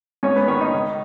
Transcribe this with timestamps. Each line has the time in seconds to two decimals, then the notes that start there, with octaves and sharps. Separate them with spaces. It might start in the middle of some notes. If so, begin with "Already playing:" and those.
0.23 G#2 C#4 C#5
0.36 B3 B4
0.48 D#3 C#4 C#5
0.61 D#4 D#5
0.74 C#2